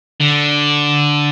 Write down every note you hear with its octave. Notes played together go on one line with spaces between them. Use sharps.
D3